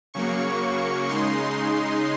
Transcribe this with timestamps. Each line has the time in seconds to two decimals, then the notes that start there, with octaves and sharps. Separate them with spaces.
0.14 C#3 F#3 A#3 C#6
0.62 C#6
1.09 C#3 G#3 D#4 C6